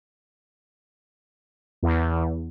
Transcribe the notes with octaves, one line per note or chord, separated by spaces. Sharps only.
E2